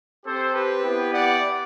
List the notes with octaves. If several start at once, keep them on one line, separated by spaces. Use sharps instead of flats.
C4 G4 A4 C5
G4 B4
B3 E4 G4
D5 F#5